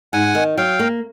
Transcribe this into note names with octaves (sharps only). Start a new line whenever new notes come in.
G#2 F#5 G#5
D#3
F#3 F5 G5
A#3